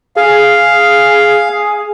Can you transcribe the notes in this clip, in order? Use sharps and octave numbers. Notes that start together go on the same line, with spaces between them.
G#4 F5